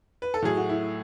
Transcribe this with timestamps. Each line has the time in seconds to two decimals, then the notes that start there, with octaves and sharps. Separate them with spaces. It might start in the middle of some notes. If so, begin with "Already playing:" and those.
0.22 B4
0.34 A4
0.42 A2 F#3 A3 G#4
0.57 F#4
0.69 E4